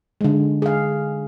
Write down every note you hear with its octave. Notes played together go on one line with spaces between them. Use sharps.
D3 G#3
G#4 F5